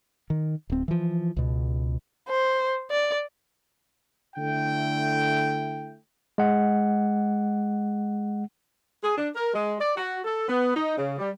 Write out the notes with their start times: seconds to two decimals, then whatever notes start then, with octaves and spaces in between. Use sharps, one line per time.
0.30 D#3
0.70 D1 C4
0.88 E3 F3
1.36 C#2 B2
2.29 C5
2.91 D5
4.36 D3 A3 E4 G5
6.38 G#3 F#5
9.03 G#4
9.17 D4
9.35 A#4
9.53 G#3
9.80 D5
9.96 F#4
10.24 A4
10.48 B3
10.75 D#4
10.97 C#3
11.18 G3